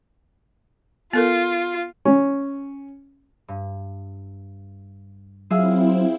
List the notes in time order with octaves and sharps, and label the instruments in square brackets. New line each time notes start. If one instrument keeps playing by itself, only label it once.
[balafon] B3 A4 A#4 [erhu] F4
[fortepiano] C#4
[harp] G2
[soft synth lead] F#3 [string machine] C4 E4 [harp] F4 G#4 E5